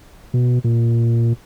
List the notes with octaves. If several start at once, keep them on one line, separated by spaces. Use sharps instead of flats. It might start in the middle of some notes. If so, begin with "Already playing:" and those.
B2
A#2